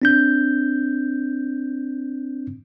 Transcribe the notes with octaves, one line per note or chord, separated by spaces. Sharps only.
C4 D4 G6